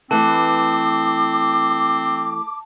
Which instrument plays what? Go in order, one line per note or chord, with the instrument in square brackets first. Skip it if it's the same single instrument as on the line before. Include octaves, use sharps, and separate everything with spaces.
[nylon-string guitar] E3 A3 B4 [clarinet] C4 [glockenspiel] A5 [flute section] D6